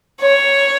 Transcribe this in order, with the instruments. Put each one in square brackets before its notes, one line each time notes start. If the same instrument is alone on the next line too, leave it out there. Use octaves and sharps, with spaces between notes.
[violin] C#5